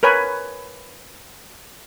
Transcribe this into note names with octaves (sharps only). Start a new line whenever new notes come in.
A#4 B4 C#5 G#5